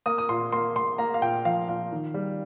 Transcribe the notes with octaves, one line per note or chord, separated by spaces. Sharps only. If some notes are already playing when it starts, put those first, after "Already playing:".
A#3 D#6
D#6
A#2 C6
A#3 C6
A#3 C6
A#3 A#5
F5
A#2 G5
F3 F5
A#2 F5
D#3
G3